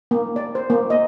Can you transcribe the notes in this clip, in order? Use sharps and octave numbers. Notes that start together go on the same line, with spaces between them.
A#3
D5
C5
A#3
D#5